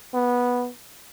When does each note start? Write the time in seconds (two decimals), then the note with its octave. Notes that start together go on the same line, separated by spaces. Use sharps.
0.14 B3